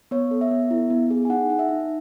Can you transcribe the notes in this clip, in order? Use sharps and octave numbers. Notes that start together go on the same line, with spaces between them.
B3 C#5
A4
E5
B3
E4
B3
G#4
G#5
D#4 F#5
D#4
E5
D#4